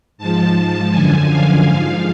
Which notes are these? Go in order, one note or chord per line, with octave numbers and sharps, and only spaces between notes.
G#2 F3 A5
A5
F#2 D3 F3 G#5
F5
G#2 F3 F5